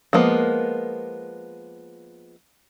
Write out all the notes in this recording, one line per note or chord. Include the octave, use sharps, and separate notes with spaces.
F3 G#3 A#3 B3